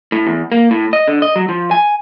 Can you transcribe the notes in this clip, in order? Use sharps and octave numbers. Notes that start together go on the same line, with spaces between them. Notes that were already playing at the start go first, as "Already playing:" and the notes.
A2
E2
A#3
A2
D#5
D3
D#5
F#3
F3
G#5